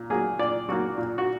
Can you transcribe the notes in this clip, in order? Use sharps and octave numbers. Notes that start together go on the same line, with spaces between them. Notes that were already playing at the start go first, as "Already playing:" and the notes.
Already playing: A#2
F#3 A#3 G#4
A#2 D5
F#3 A#3 F#4
A#2
F#4